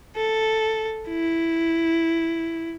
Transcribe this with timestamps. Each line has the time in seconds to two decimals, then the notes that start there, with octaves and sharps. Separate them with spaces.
0.17 A4
1.09 E4